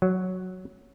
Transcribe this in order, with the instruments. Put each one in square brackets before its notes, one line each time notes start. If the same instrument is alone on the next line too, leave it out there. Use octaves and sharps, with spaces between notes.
[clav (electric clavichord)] F#3